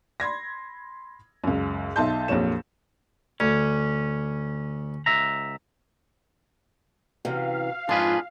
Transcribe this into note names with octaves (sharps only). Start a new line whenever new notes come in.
B5 C6 G#6 A#6
C#2 F#2
B1 D#4 E5 A5 C6 G6
A#1 F2 F#3 A#3 C#5 E7
D2 C#4
C#2 E5 A#5
F#2 C3 E3 F5
F2 G#2 F3 D4 F4 G#4 B4